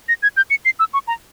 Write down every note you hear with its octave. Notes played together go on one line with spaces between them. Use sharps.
A#6
G#6
G6
C#7
C7
E6
C#6
A#5